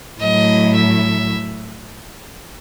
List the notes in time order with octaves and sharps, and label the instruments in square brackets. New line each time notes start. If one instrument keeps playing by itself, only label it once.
[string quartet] A2 F#3 A3 E4 [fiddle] D#5
[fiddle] E5